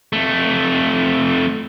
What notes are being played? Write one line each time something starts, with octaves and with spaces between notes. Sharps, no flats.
F2 A3